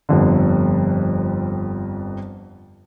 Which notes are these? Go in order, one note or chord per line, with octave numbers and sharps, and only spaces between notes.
G1 F2 D3